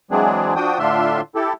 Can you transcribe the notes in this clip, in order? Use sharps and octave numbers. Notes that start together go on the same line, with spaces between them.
E3 F#3 G#3 C4 D4 G#4
F3 D4 F#4 G5 D#6
A2 D3 D4 F4 E5 C6
E4 G4 A4